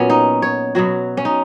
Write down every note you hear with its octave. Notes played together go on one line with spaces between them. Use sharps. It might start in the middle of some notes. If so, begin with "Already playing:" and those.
Already playing: A#2 F#3 B3 C#4
D#4
C#5
B2 F#3 F#4
C#4
D#4